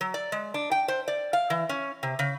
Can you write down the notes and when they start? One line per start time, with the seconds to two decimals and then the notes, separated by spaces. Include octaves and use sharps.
0.01 F#3
0.14 D5
0.32 G#3
0.54 D4
0.71 G5
0.88 C5
1.08 D5
1.33 F5
1.50 E3
1.69 C#4
2.03 C3
2.19 C#3